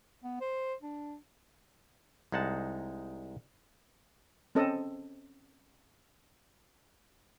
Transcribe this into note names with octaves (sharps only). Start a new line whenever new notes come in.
B3
C5
D4
C2 G#3 D#4 F#5 A5
C4 C#4 A4 D#5